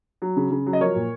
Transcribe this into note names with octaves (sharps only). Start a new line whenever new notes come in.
F#3
C#3
C#3
F#3
D#5
F3 A#4 C#5
A#2